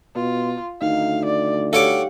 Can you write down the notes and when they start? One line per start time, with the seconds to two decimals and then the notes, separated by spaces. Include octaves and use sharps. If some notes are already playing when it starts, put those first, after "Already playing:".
0.15 B2 F4
0.82 D2 D#4 F5
1.25 D5
1.73 G4 A4 C#5 F5 F#5 D6